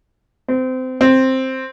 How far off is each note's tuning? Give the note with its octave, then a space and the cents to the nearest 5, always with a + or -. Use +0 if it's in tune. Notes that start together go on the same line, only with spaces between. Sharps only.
C4 -25
C4 +5